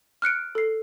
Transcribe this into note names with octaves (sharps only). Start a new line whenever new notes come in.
F6 F#6 C#7 D7
A4 C7